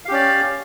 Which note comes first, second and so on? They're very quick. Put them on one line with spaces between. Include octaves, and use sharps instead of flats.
F5 G4 C#4 D5